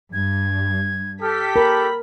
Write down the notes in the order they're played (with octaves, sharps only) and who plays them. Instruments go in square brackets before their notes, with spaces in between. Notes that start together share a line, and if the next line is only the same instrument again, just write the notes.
[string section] G2 [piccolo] G#6
[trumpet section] G4 A4 [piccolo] F6 [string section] B6
[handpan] A#4 [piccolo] B5